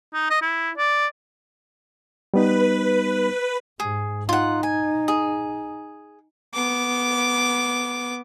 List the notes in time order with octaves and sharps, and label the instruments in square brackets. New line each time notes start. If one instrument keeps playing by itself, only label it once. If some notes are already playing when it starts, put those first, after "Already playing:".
[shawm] D#4
D#5
E4
D5
[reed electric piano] G3 B3 D#4 [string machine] B4
[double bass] G#2 [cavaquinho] G#4
[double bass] D#4 [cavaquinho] F4 F#5
[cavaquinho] G#5
G#4
[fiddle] B3 D6